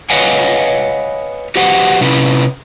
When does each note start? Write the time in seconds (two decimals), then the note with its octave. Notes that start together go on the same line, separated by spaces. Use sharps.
0.10 B4 C#5 D#5 F5 F#5 G#5
1.56 F#4 G4 B4 C5 F#5
2.01 C3 C#4 E4 B4